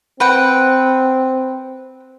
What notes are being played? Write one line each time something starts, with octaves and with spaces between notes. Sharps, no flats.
C4 B4 F#5 G5